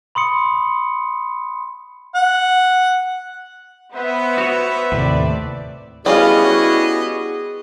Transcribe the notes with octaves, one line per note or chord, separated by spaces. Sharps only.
B5 C6 D#6 C#7
F#5
B3 B4 C5 E5
F#4 C#5
D#2 A2 C3 D5
G3 B3 C#4 E4 F#4 G#4 D#5 F5